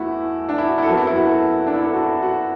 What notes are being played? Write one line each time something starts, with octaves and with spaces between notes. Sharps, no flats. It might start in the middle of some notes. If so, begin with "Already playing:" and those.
Already playing: E2 E3 A3 E4 F#4
D4
E4
F#4
E4
A4
F#2 F#3 B3 F#4
E4
E4
F#4
A4
D4
E4
A4
F#4
E4
F#4